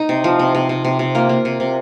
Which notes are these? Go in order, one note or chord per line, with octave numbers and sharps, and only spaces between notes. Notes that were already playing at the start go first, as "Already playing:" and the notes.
Already playing: D#4
C3
F3
C3
C3
C3
C3
C3
A#3 F4
A#3
C3
C3